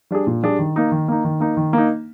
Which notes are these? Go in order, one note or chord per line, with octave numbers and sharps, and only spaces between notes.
G3 D4 G#4
A#2
G3 D4 G#4
D#3
A#3 D#4
D#3
A#3 D#4
D#3
A#3 D#4
D#3
A#3 D#4